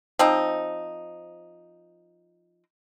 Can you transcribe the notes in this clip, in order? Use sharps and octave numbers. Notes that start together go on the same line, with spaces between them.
F3 C4 D#4